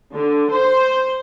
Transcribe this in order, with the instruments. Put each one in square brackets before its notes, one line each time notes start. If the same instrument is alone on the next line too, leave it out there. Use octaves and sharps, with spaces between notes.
[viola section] D3
C5